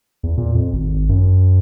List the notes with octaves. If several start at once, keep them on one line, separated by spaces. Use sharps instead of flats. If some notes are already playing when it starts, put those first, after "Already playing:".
E2
A#2
F2
G#1
F#2